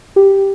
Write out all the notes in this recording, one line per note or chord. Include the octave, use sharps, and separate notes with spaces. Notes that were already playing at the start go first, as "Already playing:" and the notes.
G4